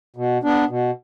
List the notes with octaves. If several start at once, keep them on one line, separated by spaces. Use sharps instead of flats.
B2
B3 D4
B2